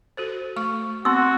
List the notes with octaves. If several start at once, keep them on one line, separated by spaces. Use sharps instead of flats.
F#4 A4 C5
A3 C#6
B3 C4 F#4 C6 E6